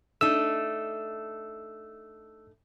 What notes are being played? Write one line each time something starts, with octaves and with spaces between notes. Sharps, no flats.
A3 D4 D#4 E6